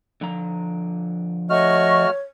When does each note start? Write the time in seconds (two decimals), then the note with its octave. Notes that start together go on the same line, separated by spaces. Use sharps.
0.21 D3 F3 A#5
1.50 A3 F#4 C#5 D#5 C#6 F6